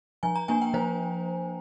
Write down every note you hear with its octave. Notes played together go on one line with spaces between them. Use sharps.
F3 G#5
A#5
A#3 D4 G#5
G5
F3 C5